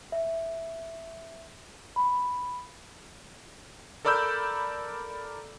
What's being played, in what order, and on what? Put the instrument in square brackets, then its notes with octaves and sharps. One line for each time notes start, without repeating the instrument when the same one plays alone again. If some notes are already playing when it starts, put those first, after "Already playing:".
[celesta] E5
B5
[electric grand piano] A4 A#4 D5 B5 E6 G6